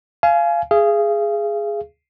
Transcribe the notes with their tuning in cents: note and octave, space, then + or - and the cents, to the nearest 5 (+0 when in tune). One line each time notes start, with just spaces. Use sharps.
F5 -20 G#5 +25
G#4 +0 F5 -40